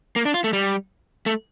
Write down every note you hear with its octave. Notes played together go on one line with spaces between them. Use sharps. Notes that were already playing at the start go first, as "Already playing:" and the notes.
A#3
D4
F4
A3
G3
A3